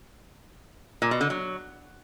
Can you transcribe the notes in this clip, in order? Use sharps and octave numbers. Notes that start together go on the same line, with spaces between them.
A#2
B2
D3
F#3